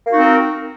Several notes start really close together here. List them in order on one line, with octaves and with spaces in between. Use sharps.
A#3 F#4 D#4 C4 A#4